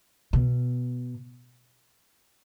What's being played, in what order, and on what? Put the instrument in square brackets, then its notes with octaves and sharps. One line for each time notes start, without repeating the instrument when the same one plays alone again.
[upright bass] B2